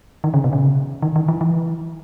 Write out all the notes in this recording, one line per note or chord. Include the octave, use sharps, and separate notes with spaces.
D#3
C#3
B2
C#3
D#3
D#3
E3
E3